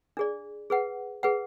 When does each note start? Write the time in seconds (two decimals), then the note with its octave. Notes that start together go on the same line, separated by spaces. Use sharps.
0.17 D4 G#4 D5
0.70 G#4 B4 F#5
1.23 G#4 B4 F#5